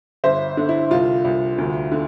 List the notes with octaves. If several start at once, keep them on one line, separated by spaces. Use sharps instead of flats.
G1 C5 E5
D3
E4
C2 F4
C2
D2
D3